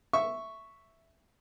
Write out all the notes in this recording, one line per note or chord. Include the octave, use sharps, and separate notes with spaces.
E5 C#6